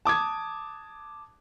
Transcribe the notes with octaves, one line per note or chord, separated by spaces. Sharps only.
A5 D6 D#6 G#6